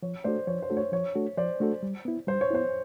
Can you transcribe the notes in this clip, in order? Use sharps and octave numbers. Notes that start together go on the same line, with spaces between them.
F3 C#5
A3 D4 F#4 A4 C5 D5
F3 C#5
C5
A3 D4 F#4 A4
C#5
F3 C#5
A3 D4 F#4 A4
F3 C5 D5
A3 D4 F#4 A4
G3
B3 E4
G3 C5
C#5
B3 E4 C5